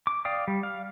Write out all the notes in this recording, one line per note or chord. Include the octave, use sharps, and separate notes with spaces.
D6
D5 F5 G5 D#6
G3
F5